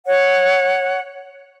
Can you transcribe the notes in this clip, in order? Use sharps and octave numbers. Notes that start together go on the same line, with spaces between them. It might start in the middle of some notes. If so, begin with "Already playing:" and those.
C#5 F#5